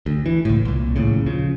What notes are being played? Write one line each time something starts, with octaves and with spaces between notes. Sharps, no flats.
D2
E3
C#2 A2
C2 A#2
A#1 D#2 A2 C#3
C#3 F3